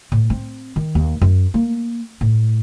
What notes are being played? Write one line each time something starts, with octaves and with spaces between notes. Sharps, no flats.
A2
C4
D#3
D#2
F#2
A#3
A2